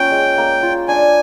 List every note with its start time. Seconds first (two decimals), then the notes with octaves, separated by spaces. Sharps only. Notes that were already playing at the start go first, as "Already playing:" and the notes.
Already playing: A#3 C#4 F4 G5
0.11 G#3
0.38 A#3
0.63 F4
0.88 D4 G#5